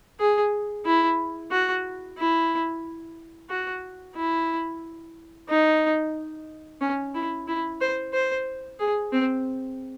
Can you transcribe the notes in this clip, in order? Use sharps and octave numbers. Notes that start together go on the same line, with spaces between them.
G#4
E4
F#4
E4
F#4
E4
D#4
C#4
E4
E4
C5
C5
G#4
C4